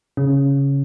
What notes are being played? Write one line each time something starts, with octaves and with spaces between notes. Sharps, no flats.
C#3